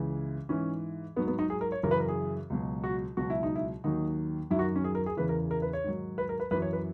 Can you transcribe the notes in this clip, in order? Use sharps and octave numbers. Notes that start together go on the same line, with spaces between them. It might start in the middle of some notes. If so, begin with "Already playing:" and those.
Already playing: C#2 C#3 E3
G#2 E3 C#4
G#2 F#3 B3
B3
D#4
G#4
A#4
C#5
F#2 C#3 E3 A#4
B4
A#4
G#4
C#2 B2 F#3
F#4
C#2 B2 F#3 F#4
E4
D#4
E4
D#2 D#3 F#3 D#4
F#2 D#3 F#3 E4
F#4
C#4
G#4
A#4
G#4
E2 C#3 E3 B4
A#4
A#4
B4
C#5
G#2 D#3 F#3
B4
A#4
B4
F#2 E3 B4
C#5
B4